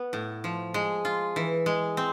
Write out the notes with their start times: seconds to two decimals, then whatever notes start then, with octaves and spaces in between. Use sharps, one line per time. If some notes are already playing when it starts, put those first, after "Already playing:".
Already playing: B3
0.13 A2
0.44 F3
0.74 G#3
1.05 F4
1.36 E3
1.66 G#3
1.97 C4